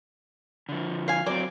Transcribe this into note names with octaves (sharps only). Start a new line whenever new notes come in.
D3 F3
F5 G#5
F#3 C4 D5